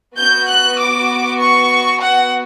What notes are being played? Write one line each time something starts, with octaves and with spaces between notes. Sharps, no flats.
B3 F#4 G6
F#6
D6
C#6
F#5